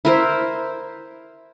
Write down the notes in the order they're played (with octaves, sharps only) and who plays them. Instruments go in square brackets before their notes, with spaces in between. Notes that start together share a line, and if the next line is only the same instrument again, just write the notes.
[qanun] E4 A#4 C5